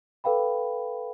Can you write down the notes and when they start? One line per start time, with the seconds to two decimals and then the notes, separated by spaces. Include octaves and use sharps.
0.24 A4 B4 F5 G5 B5